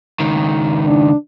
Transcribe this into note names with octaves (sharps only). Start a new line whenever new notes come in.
C#2 D#3
D4